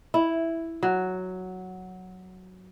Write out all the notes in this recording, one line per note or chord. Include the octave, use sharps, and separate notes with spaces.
E4
F#3